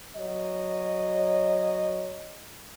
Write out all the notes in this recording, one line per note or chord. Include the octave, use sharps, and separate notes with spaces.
F#3 C#5 D#5